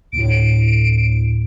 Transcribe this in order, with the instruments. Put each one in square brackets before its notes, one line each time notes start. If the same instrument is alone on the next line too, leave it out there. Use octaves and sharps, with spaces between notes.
[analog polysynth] D2 A2 [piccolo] D7